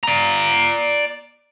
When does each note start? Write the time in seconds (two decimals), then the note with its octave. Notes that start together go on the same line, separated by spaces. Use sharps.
0.03 D5 A#5